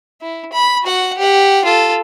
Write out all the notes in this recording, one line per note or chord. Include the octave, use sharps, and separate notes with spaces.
E4
B5
F#4 F#5
G4 F#5
F4 A4